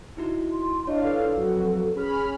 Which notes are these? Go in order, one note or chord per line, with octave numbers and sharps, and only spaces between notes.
D#4 E4 F#4
C6
D4 E4 F4 C#5 D#5 F5
A4 B4
F2 F#3 F#4
C#4 G#4 B5 F6